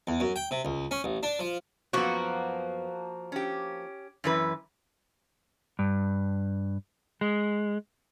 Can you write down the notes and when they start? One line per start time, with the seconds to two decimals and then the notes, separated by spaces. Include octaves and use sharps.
0.07 E2
0.20 F#2
0.36 G5
0.51 C3
0.65 C#2
0.91 C#4
1.04 A1
1.23 D4
1.39 F3
1.93 F#2 F3 A#3 B3 F#4
3.32 C#4 G4
4.24 F#2 E3 B4
5.79 G2
7.21 G#3